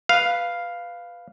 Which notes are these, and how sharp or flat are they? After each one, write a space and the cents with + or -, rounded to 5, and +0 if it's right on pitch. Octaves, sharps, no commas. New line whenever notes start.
B4 +0 F5 +0